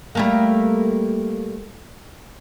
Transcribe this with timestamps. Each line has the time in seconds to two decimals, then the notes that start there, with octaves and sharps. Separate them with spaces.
0.15 G3 A3 A#3